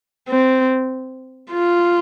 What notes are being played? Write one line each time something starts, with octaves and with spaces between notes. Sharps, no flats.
C4
F4